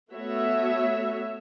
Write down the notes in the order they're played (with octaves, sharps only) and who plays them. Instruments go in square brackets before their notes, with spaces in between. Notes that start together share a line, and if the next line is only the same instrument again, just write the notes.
[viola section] A3 B3 F#4 C#5 E5